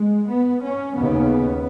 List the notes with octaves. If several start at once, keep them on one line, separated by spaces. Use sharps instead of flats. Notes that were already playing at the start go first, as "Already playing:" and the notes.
Already playing: G#3
B3
C#4
D#2 C#3 B3